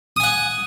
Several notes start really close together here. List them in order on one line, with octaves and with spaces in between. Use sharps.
D#6 G#5 F#5